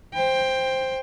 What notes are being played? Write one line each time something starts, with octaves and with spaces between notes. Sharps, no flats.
C5 G5